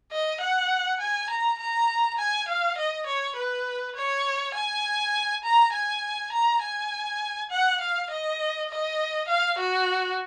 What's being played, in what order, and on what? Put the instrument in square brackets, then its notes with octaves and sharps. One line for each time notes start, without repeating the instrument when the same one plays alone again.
[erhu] D#5
F#5
G#5
A#5
A#5
G#5
F5
D#5
C#5
B4
C#5
G#5
A#5
G#5
A#5
G#5
F#5
F5
D#5
D#5
F5
F#4